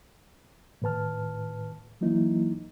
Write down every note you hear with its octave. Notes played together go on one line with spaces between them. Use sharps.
A2 D#3 B4 A5 F6
E3 F#3 A#3 D#4 E4